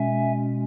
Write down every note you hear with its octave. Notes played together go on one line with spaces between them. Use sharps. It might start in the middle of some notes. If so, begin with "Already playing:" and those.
Already playing: B2 G#3 C#4 E5 G#5